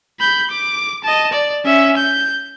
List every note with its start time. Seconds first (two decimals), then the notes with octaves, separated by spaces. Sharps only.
0.20 B5 G6
0.50 D6
1.04 D#5 A5
1.32 D5
1.65 C#4 E5
1.97 G6